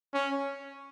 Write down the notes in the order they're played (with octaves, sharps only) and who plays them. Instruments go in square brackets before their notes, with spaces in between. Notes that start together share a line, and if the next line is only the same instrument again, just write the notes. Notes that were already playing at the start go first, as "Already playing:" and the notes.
[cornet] C#4